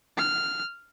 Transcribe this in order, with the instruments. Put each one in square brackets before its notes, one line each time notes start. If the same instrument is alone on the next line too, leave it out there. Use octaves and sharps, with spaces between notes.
[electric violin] F6